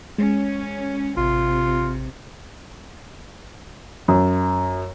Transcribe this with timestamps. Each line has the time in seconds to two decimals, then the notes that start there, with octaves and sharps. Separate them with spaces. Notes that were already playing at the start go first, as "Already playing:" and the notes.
0.18 G#3 C#4
1.17 A1 C3 F4
4.08 F#2